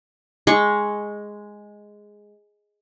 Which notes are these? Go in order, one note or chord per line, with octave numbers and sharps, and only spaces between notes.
G#3 C#6